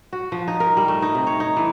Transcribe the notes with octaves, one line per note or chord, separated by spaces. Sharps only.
F#4
F3
D#4
A#4
G3
A3
D#4
C3
C#5
D#4
E3